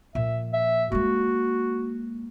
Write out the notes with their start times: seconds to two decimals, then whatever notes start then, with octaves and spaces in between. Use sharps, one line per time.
0.15 A#2 F3 E5
0.53 E5
0.92 G#3 A#3 F#4